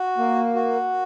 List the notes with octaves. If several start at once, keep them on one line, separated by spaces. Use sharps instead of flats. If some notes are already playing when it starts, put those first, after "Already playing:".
Already playing: F#4
A#3
F#4